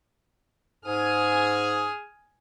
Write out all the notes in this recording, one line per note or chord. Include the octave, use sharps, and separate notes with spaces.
G#2 G#4 G#5 D#6 F6